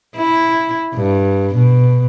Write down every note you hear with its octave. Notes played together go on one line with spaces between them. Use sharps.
E4
G2
B2